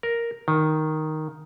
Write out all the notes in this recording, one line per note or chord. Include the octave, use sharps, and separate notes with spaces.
A#4
D#3